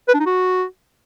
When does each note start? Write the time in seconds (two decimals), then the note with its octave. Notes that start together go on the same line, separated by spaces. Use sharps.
0.08 B4
0.14 D4
0.20 D#4
0.26 F#4